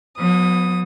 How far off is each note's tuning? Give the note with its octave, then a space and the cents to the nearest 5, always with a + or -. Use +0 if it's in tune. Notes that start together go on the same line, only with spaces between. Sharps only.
F#3 -45 B3 +0 D#6 +0